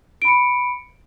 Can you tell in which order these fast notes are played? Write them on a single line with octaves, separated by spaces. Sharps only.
D7 B5 C#7